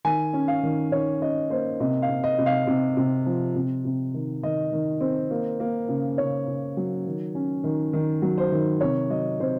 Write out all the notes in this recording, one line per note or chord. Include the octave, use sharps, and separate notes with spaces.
D#3 G#5
C#4
F5
D#3
D#3 C#5
C#4 D#5
A#3 C5
C3 D#5
F5
C3
D#5
C3
F5
C3
C3
F3
C3
C3
D#3
D#3 D#5
D#3
C4
A#3
A#3
C#3
C#3 C#5
C#3
F#3
D#3
C#4
D#3
D#3
F#3
C5
D#3
C3 C#5
F#3 D#5
C3 C5